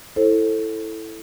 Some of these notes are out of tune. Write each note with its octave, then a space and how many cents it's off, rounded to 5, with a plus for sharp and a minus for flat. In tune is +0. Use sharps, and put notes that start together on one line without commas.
E4 +0 A4 +0 C5 +30